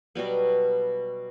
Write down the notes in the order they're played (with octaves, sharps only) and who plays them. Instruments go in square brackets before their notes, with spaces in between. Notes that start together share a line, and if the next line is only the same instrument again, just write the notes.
[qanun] B2 F#3 G3 B3